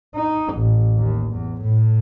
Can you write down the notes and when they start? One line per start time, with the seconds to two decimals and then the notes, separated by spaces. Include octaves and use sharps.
0.15 D#4
0.54 A1
0.97 D#2
1.32 E2
1.61 A2